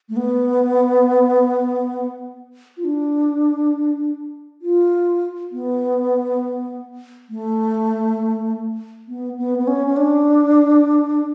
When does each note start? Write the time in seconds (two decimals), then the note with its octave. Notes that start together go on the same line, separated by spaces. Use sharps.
0.09 A3
0.16 B3
2.77 F4
2.84 D4
4.62 F4
5.52 B3
7.29 A3
9.08 B3
9.37 B3
9.58 B3
9.67 C#4
9.86 C#4
9.97 D4